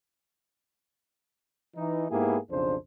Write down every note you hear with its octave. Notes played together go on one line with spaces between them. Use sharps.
E3 D#4
G#2 A#3 B3 E4 G4 G#4
B1 F2 C#3 D4 C5